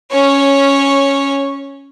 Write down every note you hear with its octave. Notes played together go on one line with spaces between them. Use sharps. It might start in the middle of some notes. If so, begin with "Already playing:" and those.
C#4 C#5